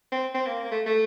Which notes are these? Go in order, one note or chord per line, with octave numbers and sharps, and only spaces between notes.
C4
C4
A#3
A#3
A3
A3